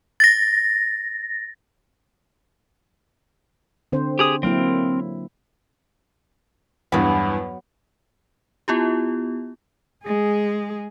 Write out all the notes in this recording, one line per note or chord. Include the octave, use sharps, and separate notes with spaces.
A6 A#6
D3 C4 C5
G4 G#4 D#6
F#3 A#3 C4 E4 A#4
E2 G2 F#3 B3
B3 E4 F4 G4
G#3 G#4